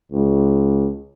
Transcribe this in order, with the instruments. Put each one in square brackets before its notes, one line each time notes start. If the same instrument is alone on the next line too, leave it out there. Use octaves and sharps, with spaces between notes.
[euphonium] C#2